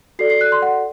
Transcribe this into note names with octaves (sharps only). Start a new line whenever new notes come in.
F#4 A4 D5 C7
C7
F#6
C6
F#5